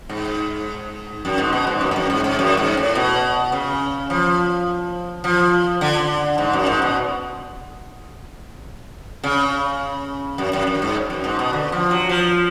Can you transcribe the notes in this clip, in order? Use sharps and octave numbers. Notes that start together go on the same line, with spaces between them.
G#2
F#2
G#2
B2
G#2
F#2
G#2
F#2
G#2
G#2
F#2
G#2
A2
B2
C#3
F3
F3
D3
G#2
F#2
G#2
B2
C#3
F#2
F#2
F#2
G#2
F#2
G#2
B2
D3
F3
F#3
F3